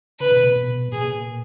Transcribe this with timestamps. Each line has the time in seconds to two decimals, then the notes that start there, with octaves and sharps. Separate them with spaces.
0.20 C#3 B4
0.32 B2
0.44 B2
0.56 B2
0.92 A#2 G#4